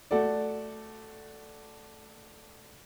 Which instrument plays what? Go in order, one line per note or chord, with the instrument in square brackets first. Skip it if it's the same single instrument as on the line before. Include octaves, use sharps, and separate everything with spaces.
[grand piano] A3 F#4 A4 D5